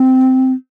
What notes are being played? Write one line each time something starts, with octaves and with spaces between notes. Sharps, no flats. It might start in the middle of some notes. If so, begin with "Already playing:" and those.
Already playing: C4